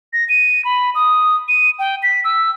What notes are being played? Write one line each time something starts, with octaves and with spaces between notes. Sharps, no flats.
A#6
D#7
B5
D#6
D#7
G5
B6
E6